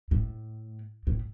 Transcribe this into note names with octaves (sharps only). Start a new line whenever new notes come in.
A2
A2